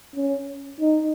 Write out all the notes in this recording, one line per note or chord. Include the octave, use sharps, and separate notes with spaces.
C#4
D#4